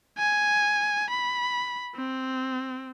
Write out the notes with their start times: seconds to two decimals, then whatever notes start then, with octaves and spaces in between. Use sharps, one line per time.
0.18 G#5
1.10 B5
1.96 C4